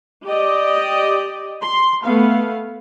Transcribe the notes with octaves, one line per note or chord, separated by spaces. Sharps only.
G4 D5 D#5
C6
A3 B3 F5